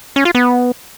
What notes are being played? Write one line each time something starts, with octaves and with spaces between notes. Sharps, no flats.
C#4
F4
B3